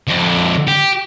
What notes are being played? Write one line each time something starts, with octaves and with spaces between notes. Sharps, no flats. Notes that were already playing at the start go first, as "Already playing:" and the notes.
F2 D3
G4